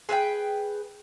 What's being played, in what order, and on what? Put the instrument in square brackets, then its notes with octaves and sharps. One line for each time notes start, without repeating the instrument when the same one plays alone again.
[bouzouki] G#4 B4 E5 G5